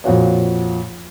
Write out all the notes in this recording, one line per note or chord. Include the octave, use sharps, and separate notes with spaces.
F2 A#2 F#4 C#5